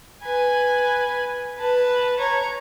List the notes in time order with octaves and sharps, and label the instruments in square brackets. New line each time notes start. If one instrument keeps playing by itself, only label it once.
[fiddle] B4 G#5
B4 A5
C#5 A#5